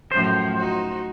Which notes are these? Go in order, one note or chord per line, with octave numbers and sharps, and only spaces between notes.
F#2 A2 F3 C5
D#4 F#4